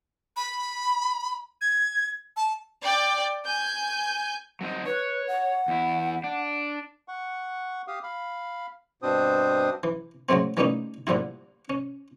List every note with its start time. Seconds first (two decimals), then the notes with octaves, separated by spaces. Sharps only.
0.36 B5
1.61 G#6
2.37 A5
2.82 D5 G5
3.45 G#5 G6
4.61 F#3 C4 D#4
4.86 B4 C#5
5.28 F#5
5.68 E2 E4
6.24 D4
7.08 F#5 C#6
7.88 G4 F5 D#6
8.03 F5 B5
9.02 G2 B2 C4 D4 C5 D#6
9.83 E3
10.29 C#3 F#3 G#3 A3 C4
10.57 E3 G3 A3 A#3 C#4 D#4
11.07 A#2 D3 F3 G3 E4
11.70 C#4